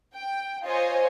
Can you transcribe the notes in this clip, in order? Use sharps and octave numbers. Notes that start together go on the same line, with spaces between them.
G5
F4 C5 C#5 D#5 G#5